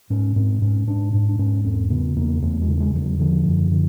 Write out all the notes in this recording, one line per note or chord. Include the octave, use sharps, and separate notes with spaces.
G#2 C#4
G#2 C4
G#2 C#4
G#2 D4
G#2 D4
D4
G#2 C#4
E2 C4
C#3 B3
E2 A#3
E2 A3
G#3
C#3
A3
G#3
E2 F3
F#3
D3 F3
F#2
D3